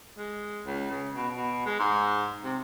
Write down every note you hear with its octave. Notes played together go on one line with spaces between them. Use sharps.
G#3
C#2
C#3
B2
B2
G#3
G#2
C3